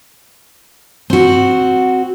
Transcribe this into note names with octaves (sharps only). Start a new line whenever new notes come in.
C4 F#4